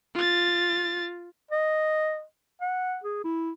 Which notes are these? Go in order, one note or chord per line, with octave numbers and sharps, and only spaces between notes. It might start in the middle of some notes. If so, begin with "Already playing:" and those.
F4 A6
D#5
F#5
G#4
E4